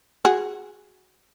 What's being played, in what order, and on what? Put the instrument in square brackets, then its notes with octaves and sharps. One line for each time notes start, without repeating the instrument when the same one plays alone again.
[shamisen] F#4 G#4